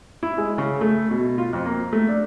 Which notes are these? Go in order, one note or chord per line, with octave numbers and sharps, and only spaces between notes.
E4
G#3
C#3
A3
B2
F4
F2
A#3
A3
D4